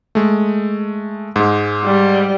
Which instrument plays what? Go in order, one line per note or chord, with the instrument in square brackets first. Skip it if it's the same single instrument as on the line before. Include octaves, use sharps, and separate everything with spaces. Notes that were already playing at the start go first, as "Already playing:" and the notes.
[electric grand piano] G#3 A3
G#2 G#3
[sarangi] G3